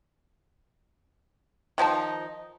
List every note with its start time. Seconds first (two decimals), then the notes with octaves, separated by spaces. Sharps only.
1.78 D#3 F3 D#4 A5